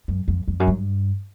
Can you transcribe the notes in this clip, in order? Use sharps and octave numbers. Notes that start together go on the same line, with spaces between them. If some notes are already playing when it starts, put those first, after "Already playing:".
F#2
F2
F2
F#2
G2